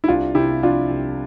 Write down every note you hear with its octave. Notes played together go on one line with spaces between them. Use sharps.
E4
C2 D4 F4
C3 E4 G4
F3 D4 F4
C2